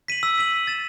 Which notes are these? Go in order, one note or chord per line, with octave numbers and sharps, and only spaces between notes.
B6 D#7 F#7
E6
B6 D#7 F#7
E6
A6 E7